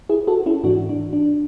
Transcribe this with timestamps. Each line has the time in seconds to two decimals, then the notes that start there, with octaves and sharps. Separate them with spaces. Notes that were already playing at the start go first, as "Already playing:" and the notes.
0.09 E4 G#4
0.27 F#4 A4
0.46 C#4 E4
0.64 G#2 E3 D4 F#4
0.89 D4
1.13 D4